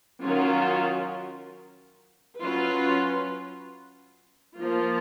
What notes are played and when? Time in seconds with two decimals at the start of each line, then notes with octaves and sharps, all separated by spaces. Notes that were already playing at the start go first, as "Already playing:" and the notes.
0.21 D#3 F#3 C#4 F4 A#4
2.39 F#3 C#4 F4 B4
4.58 F3 A#3 F4